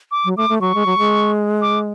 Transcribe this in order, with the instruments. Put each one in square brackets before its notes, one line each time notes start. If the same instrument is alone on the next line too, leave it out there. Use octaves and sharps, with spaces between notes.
[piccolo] D6
[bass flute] F#3
[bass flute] A3 [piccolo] D6
[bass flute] A3
[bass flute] F#3 [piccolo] C#6
[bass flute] G#3
F#3
G#3
[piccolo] D6